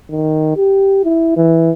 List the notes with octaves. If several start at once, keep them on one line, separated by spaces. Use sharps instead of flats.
D#3
G4
E4
E3